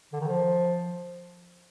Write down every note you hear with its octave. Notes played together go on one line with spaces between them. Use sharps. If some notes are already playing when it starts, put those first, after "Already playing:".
D3
D#3
F3